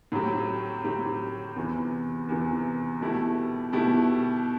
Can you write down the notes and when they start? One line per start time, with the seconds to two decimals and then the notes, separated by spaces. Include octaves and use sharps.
0.12 A2 F#3 C4 G4
0.84 A2 F#3 C4 G4
1.56 E2 C3 E3
2.29 E2 C3 E3
3.00 B2 A3 E4 G4
3.72 B2 A3 E4 G4